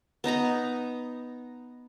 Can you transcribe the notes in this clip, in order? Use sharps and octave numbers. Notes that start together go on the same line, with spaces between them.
B3 D#4 D#5 A#5